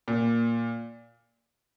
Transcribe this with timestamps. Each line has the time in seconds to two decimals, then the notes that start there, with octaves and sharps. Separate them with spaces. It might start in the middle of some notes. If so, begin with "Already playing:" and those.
0.08 A#2